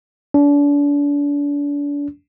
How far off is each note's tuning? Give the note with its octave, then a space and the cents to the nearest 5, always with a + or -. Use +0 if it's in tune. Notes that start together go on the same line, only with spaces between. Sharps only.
D4 -35